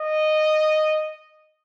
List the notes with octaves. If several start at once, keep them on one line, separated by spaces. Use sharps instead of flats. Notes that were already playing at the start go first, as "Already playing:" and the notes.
Already playing: D#5